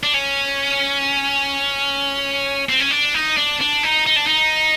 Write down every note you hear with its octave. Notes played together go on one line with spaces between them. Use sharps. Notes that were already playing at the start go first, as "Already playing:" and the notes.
D4
C#4
C4
C#4
D4
D#4
D4
D4
D#4
D#4
D4
D#4